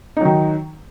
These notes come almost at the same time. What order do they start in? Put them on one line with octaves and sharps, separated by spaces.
D#4 F#3 D#3